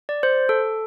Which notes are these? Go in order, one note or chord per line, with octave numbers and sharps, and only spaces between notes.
D5
C5
A4